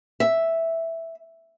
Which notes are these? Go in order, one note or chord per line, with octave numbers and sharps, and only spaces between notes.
E5